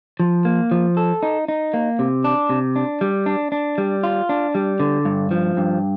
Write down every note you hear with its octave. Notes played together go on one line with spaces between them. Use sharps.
F3
A#3
F3
A4
D#4
D#4
A#3
C3
D4
C3
D4
G3
D4
D4
G3
F4
D4
G3
D3
G2
F3
G2